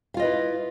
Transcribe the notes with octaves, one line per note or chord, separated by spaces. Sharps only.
E4 F4 B4 D#5 F5